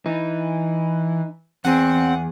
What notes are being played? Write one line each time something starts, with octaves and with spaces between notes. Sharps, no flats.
E3 D#4
E2 C4 G#4 F#5